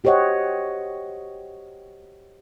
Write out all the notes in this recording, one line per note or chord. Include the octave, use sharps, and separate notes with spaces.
F#4 G4 C5 C#5 D#5 F#5